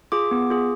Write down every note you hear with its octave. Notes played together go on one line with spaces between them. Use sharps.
F4 G#4 D6
B3
F4 G#4